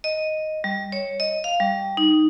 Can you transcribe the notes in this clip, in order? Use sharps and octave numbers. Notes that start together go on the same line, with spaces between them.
D#5
G3
C#5
D#5
F5
G3
D#4